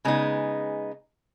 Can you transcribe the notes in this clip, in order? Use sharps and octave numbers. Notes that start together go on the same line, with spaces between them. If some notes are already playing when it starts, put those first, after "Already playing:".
C#3 G#3 B3 D#4